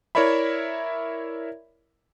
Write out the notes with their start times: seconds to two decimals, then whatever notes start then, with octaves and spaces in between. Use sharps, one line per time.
0.15 E4 A#4 C#5 D5 E5 B5